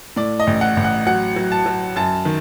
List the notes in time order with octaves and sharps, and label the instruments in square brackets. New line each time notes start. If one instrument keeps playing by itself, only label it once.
[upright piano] A2 D5
D#5
A1
F#5
A1
F#5
F#3 F#5
F#3
A5
F#3
F#2 A5
D#3